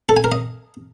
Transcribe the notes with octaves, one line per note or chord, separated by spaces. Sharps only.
A4
G#5
A#4
D#5